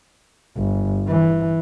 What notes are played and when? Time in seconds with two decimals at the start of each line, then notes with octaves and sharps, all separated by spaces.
0.56 G1
1.08 E3